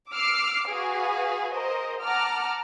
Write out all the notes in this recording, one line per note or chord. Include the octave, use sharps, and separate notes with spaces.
D6 E6 F6 C7 D7
F#4 G#4 B4 F5 G#5
A#4 C5 D#5
F#5 A5 A#5 D6 F6